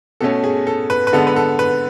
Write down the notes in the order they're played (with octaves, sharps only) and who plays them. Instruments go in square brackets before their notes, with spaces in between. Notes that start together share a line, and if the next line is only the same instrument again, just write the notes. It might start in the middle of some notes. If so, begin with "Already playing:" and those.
[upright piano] B2 A3 C#4 A4
G#4
A4
B4
B4
D3 G#3 B3 A4
B4
A4
B4